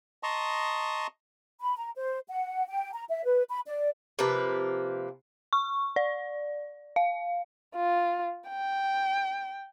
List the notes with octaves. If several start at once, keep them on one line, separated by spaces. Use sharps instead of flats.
D#5 A5 A#5 C6 C#6 D#6
B5
A#5
C5
F#5
G5
A#5
E5
B4
B5
D5
C3 F3 A#3 B4
C#6
D5
F5
F4
G5